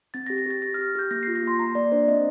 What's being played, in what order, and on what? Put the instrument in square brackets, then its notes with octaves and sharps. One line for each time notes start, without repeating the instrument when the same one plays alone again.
[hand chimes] C4 A6
A#6
G4
A#6
G4 A6
G4 A#6
F6
G4
G4 G6
A#3 A#6
C7
F4
A#6
A#3 C6
A#3 A#5
A#3 D5
D4 C5
C4 D#5